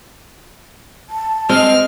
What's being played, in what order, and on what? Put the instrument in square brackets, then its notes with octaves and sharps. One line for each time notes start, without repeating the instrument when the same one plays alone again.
[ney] A5
[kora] G#3 [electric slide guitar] C4 [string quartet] F6